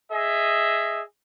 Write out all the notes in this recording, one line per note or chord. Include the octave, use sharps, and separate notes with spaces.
G#4 D#5 E5